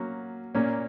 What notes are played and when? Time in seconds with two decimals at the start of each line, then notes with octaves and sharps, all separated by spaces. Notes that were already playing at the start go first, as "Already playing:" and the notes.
Already playing: F#3 A#3 C#4 F#4
0.55 A#2 A#3 C#4